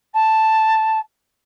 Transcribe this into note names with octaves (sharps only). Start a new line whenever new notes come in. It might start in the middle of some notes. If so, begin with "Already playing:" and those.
A5